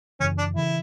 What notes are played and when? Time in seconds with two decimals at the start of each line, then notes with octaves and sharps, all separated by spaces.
0.20 F#2 C#3 E3 C#4
0.38 D4
0.56 C#3 E3 E4